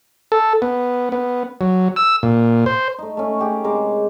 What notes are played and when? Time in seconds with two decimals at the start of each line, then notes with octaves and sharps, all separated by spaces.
0.32 A4
0.62 B3
1.12 B3
1.61 F#3
1.96 E6
2.23 A#2
2.66 C5
2.99 A3 D#4
3.17 A3 C#4
3.39 C#4 G4 G#4
3.64 C3 G#3 A#4 D6